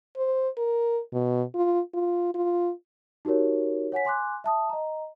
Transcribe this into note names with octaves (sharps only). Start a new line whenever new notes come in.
C5
A#4
B2
F4
F4
F4
D#4 F#4 G4 A#4 C#5
C#5 F#5 G#5 B6
G#5 C6 D6 F#6
E5 A5 D#6
D#5 A#5